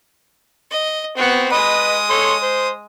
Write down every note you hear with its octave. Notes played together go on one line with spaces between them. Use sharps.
D#5
B3 C4 F#4
G#3 B4 D#5 B5 D#6
A4 C#5 C6
C5